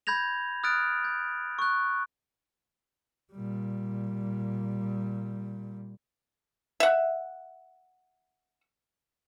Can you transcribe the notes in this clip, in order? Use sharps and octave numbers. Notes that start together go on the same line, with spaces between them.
B5 G6 G#6 A#6 F7
D#6 F6 F#6 A6 D7
G6
C#6 F#6
A#2 G3
E5 F#5